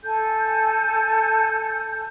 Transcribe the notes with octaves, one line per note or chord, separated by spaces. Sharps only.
A4 G#5 G6